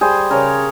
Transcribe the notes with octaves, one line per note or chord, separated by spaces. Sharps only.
G3 G#4 C5
C#3 A#4 C#5